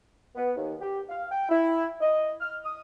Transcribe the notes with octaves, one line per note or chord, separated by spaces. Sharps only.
B3
D#2
G4
F5
G5
E4
D#5
F6
D#6